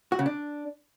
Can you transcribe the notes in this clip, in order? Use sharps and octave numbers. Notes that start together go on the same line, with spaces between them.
F#4
C#3
D4